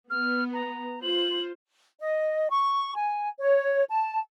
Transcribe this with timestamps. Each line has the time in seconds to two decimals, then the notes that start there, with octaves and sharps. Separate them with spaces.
0.10 B3 F6
0.54 A#5
1.02 F4 C5 F#7
1.99 D#5
2.51 C#6
2.96 G#5
3.40 C#5
3.90 A5